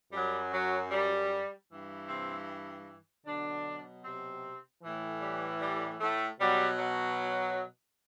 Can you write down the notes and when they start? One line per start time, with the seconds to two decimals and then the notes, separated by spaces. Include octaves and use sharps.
0.13 F#2 F#3 G3
0.52 F#3
0.91 G3
1.70 G2 E3
2.08 C3 C4
3.26 B2 D3 F#3 D4
4.04 C3 C4
4.83 A2 E3
5.22 G3
5.61 G3
6.01 A2 A3
6.39 B2 F#3 G3
6.79 F#3